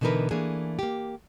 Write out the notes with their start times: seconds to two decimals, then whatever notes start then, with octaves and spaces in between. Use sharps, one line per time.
0.01 B2 D3 E3 D#4 A#4 B4
0.31 E3 A3 A#3 D4 G#4
0.79 A#3 G4